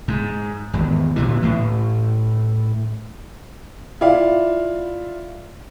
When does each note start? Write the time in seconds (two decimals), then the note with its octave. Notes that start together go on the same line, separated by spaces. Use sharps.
0.08 G#2
0.73 G#1 E2
1.16 A#2 D3 E3
1.42 A2 E3
4.01 E4 F4 D5 F5